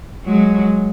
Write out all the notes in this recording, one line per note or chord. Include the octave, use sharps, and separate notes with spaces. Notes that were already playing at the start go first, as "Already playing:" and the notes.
F#3 G#3